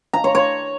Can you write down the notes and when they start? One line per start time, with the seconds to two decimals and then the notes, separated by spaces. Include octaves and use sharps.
0.13 A#5
0.24 C#5
0.35 C#5